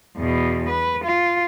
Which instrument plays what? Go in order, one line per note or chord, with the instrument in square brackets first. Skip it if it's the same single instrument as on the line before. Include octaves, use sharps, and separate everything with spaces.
[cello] E2 B2
B4
F4